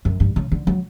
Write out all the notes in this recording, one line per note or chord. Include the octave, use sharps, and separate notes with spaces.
F#2
G2
C#3
D3
F#3